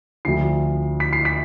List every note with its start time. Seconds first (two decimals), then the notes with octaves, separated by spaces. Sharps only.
0.25 D2 D3 F3 C7
1.00 B6
1.13 C7
1.25 B6